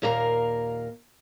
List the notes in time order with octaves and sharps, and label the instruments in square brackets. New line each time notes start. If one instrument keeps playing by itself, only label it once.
[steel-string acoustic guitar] D#2 A#2 A#4 F5 G#5 A#5